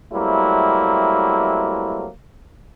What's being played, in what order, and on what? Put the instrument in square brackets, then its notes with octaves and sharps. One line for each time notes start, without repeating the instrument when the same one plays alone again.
[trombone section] F#3 G3 A3 A#3 C4 E4